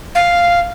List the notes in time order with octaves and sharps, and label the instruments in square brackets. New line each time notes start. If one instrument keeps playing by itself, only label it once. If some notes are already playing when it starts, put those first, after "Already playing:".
[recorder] F5